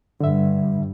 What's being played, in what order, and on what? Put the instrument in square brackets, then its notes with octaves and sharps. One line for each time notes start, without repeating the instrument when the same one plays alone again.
[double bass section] G2 [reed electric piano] D3 E5